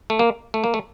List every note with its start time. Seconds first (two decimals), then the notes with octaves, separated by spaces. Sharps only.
0.10 A3
0.19 A#3
0.54 A3
0.64 A#3
0.74 A3